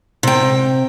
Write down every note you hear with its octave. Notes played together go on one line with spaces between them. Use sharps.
C3 G5